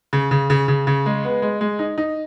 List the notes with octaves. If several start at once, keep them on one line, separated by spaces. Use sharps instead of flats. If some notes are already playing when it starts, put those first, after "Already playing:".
C#3
C#3
C#3
C#3
C#3
G#3
B3
G#3
G#3
D#4
D#4